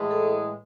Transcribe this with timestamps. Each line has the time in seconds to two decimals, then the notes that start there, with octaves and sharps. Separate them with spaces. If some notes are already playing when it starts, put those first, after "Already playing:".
Already playing: A2 E3 G#3
0.11 A4